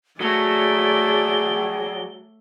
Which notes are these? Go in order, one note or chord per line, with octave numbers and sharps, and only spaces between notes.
F#3 A3 G#4 D5 G7